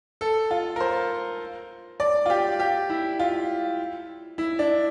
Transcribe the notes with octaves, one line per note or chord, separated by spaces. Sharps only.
A4
F4
A#4
C5
D5
F4
G4
G4
E4
F4
E4
D4